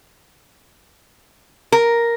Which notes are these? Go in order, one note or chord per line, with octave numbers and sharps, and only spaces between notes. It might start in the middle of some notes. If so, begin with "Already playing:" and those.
A#4